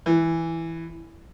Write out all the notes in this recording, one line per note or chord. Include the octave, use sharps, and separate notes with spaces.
E3